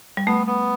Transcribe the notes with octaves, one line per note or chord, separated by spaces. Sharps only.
G3
A3 B3
B3